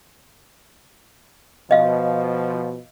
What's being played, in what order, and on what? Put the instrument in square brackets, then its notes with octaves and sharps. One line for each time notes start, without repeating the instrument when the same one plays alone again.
[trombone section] B2 F3 [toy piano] D#5 F5